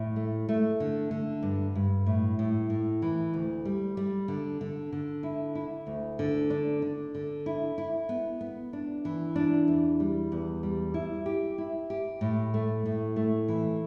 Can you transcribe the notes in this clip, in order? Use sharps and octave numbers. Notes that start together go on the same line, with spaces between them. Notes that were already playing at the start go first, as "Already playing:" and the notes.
Already playing: A2
A3
A3
D3
D3
G2
G2
A2
A2
A2
E3
D2
G3
G3
D3
D3
D3
E4
E4
D2
D3
D4
D4
D3
E4
E4
B3
B3
D4
E3
D4
E2
G3
E2
G3
E4
G4
E4
G4
A2
A3
A2
A3
E3